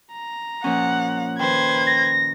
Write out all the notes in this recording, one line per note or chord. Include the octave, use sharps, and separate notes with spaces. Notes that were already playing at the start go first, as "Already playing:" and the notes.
A#5
A#2 F3 C#4 F#5
D#3 B4 C5 G5 G#6
A#6